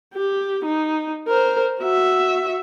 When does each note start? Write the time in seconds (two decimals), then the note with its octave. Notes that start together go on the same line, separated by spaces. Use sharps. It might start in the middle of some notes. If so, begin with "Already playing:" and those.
0.14 G4
0.65 D#4
1.28 A#4 C5
1.80 F#4 E5